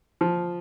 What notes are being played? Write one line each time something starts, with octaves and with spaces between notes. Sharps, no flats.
F3